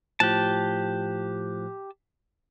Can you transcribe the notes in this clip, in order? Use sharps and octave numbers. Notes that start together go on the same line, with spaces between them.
A2 F3 G4 A5 F#6